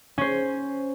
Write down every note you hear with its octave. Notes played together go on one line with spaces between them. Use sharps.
C#4 C5